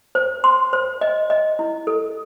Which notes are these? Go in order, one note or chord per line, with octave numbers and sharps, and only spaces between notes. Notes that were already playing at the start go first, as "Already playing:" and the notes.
C5
C6
C5
D#5
D#5
E4
A4